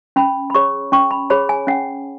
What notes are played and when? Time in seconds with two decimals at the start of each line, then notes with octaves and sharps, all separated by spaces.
0.16 C#4 B5
0.50 B5
0.54 G#4 C#5 C#6
0.92 C#4 C#6
1.11 B5
1.30 G#4 C#5 B5
1.49 G#5
1.67 C#4 F#5